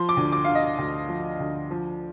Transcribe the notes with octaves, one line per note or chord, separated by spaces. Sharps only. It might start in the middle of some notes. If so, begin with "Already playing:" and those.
Already playing: F3 C6
D6
D2
D6
D3 F5
D#5
D2
F3
D2
F3